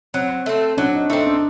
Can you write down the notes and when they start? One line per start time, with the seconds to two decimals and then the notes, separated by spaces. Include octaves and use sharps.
0.14 F#3 C4
0.46 A3 C4
0.77 F#3 D4
0.94 D#4
1.10 A3 D#4
1.13 C4
1.26 D4